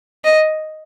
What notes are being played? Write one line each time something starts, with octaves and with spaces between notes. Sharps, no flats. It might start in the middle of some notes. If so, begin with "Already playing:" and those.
D#5